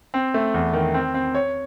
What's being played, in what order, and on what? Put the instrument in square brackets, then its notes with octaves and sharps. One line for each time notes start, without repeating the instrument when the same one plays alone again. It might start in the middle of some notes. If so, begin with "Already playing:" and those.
[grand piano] C4
A3
E2
D#3
C4
C4
C#5